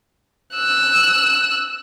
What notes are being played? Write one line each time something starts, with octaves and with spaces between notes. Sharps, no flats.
E6 F#6